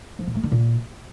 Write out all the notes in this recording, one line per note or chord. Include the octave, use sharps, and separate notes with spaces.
F3
A#2
A3
D3
A#2